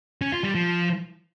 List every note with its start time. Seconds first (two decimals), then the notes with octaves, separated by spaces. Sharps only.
0.21 C#4
0.32 F4
0.44 G3
0.55 F3